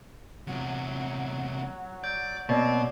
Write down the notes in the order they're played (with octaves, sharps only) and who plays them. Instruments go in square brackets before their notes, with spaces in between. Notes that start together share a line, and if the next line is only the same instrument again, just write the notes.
[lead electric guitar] E2 C3 [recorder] F#3
[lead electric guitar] D5 [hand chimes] G6
[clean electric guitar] B2 [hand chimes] A#3 C#5 D5 [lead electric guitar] C4